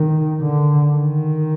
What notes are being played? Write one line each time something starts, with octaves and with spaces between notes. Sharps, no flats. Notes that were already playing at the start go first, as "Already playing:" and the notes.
Already playing: D#3
D3
D#3